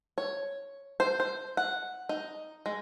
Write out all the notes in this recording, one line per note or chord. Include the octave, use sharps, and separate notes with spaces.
C#5
C5
C5
F#5
D#4
G#3